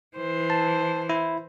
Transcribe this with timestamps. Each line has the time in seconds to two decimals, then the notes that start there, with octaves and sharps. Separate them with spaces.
0.17 E3 C5
0.50 A5
1.09 E4